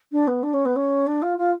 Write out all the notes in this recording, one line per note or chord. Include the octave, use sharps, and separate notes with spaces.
D4
B3
D4
C#4
B3
C#4
D4
F4
F4